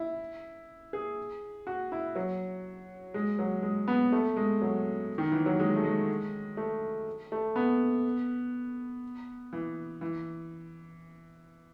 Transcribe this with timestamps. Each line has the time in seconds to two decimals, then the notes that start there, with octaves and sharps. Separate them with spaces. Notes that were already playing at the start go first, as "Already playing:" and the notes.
Already playing: E4
0.93 G#4
1.67 F#4
1.92 E4
2.15 F#3
3.14 G#3
3.39 F#3
3.63 G#3
3.88 B3
4.12 A3
4.36 G#3
4.62 F#3
5.18 D#3
5.32 E3
5.46 F#3
5.59 G#3
5.76 A3
5.84 G#3
6.57 A3
7.32 A3
7.56 B3
9.53 E3
10.01 E3